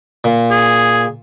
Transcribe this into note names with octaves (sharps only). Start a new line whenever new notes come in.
A#2
G#4